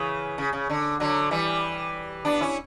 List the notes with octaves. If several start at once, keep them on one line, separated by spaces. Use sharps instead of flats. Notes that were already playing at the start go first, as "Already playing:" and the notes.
Already playing: C#3 E3
C#3
C#3
D3
D3 F#3
E3 G3
B3 D4
C#4 E4